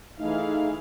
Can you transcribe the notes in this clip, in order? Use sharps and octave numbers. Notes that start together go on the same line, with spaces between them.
E3 A3 D#4 G#4 F5